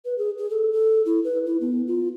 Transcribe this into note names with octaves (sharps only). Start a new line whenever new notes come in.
B4
G#4
G#4
A4
A4
E4
B4
E4
B3
F4